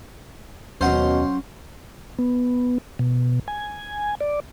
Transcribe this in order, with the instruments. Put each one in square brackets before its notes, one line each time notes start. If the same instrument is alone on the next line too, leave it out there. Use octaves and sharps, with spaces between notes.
[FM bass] D#2 [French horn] B2 [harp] F#3 C#4 F5 [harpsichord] C5 F#5 C6
[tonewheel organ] B3
B2
G#5
D5